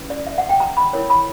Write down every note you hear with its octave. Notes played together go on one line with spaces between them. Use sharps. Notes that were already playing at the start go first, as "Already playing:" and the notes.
Already playing: C#4 E4 B4
D5
E5
F#5
G5
A#5
B5
E4 A#4 C#5
B5